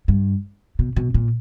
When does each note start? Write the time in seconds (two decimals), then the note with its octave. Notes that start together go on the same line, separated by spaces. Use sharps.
0.08 G2
0.79 B2
0.96 B2
1.14 A#2